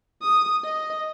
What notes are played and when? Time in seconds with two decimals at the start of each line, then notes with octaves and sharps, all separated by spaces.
0.22 D#6
0.64 D#5